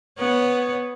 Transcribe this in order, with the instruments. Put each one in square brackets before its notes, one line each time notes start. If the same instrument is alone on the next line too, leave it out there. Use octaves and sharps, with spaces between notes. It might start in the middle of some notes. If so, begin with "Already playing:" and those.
[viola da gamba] B3 C#5